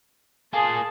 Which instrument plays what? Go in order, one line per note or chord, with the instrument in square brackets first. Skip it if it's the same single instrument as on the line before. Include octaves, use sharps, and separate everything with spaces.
[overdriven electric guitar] A#3 F4 [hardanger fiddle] G#4 [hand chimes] G#5 D#6 [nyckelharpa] A5